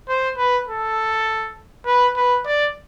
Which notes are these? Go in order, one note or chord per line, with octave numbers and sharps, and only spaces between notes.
C5
B4
A4
B4
B4
D5